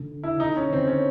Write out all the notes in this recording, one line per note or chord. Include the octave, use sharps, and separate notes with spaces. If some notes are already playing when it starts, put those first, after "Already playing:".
Already playing: D3
E4
D3 D#4
C#4
D3 C4
C#4